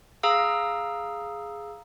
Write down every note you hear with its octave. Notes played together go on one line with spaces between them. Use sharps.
G#4 F5 A#5 E6